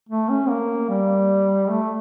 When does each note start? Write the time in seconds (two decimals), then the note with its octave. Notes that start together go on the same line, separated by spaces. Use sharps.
0.09 A3
0.29 C#4
0.49 A#3
0.89 G3
1.69 A3